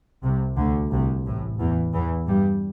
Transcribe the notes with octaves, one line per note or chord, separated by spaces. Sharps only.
C2 C3
D2 D3
C2 C3
A1 A2
E2 E3
E2 E3
G2 G3